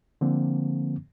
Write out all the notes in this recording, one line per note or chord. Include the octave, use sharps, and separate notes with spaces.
D3 F3 A#3 C4